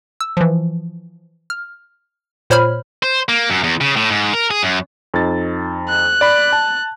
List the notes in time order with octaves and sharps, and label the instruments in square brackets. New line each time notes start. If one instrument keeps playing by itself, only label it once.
[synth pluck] E6
E3 F3
F6
A#2 C5 C#5 B5 F6
[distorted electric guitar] C5
A#3
F#2
E2
C#3
A2
G#2
A#4
G#4
F#2
[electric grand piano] F2 D#4 A6
[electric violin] F#6
[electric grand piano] D5 B5
A5